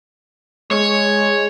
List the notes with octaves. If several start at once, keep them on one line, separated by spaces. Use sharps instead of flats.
G#3 C#5